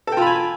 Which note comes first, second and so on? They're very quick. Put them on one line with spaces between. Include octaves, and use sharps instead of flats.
A4 G5 F4 B5 G#5